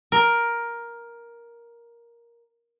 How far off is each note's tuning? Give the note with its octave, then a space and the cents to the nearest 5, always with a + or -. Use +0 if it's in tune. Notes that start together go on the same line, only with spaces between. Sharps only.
A#4 +10